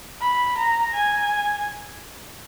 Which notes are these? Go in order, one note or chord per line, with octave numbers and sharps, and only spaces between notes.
B5
A#5
G#5